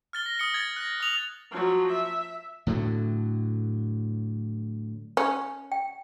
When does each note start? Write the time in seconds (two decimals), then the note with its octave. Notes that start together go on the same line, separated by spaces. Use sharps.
0.13 F6 A6 G7
0.26 A#6
0.38 D#6 C#7 G7
0.54 G#6 A6
0.76 F#6 A#6
1.00 D#6 F7
1.52 F3 F#3
1.92 E5
2.67 A2 D3 F#3
5.17 C#4
5.72 G5